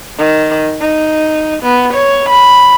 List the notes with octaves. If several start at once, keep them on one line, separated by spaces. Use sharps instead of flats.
D#3
D#4
B3
C#5
B5